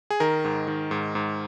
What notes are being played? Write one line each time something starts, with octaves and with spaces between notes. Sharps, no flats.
G#4
D#3 A#4
G#2
D#3
G#2
G#2